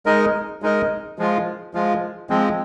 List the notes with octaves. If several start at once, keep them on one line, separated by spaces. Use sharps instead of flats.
G#3 D#4 A#4 D#5
G#3 D#4 A#4 D#5
F3 G#3 F4
F3 G#3 F4
F3 G#3 C4